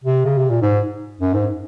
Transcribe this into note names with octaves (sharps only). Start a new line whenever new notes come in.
C3
C#3
C3
A#2
G#2
F#2
G#2